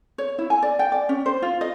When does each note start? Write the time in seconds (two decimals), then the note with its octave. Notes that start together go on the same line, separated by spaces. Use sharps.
0.18 C#5
0.39 E4
0.50 G#5
0.62 D5
0.79 G5
0.92 D5
1.09 C#4
1.26 C5
1.42 F4
1.61 D#5